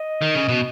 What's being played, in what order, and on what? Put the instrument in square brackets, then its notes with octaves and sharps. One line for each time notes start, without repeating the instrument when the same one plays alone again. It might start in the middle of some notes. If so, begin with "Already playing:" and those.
Already playing: [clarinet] D#5
[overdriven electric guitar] D#3
C#3
B2